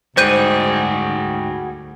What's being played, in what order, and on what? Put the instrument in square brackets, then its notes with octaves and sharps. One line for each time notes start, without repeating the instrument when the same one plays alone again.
[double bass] D2 [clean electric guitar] G#2 G3 [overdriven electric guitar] F#4 G#4 [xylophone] C5 G6 D#7